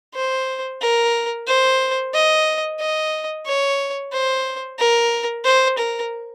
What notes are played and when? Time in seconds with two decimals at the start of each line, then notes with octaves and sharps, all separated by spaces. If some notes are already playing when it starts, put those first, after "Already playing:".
0.15 C5
0.82 A#4
1.47 C5
2.14 D#5
2.80 D#5
3.46 C#5
4.12 C5
4.78 A#4
5.44 C5
5.78 A#4